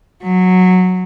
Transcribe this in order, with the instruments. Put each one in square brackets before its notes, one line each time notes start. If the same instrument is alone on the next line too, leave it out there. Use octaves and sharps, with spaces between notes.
[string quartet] F#3